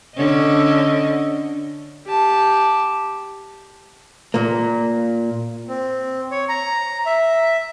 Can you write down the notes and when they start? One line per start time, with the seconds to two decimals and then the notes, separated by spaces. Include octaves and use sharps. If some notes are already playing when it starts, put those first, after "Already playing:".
0.16 D3 C#4 D#5
2.07 G4 A5
4.34 A#2 A#3
5.68 C4
6.31 C#5
6.49 A#5
7.06 E5